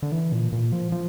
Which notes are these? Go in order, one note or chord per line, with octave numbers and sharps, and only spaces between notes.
D3
E3
A#2
A#2
F3
F3